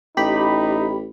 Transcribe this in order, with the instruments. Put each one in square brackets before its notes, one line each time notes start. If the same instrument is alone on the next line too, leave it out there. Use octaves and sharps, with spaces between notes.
[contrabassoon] A1 [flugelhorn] D#4 [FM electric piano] G4 B5